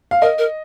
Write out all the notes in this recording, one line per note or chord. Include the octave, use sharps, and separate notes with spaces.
F5
A#4 D#5
A#4